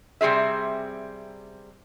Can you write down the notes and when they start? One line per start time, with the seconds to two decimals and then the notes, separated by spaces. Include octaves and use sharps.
0.21 C3 G3 C4 G#4 E5